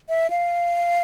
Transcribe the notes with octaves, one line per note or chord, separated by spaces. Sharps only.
E5
F5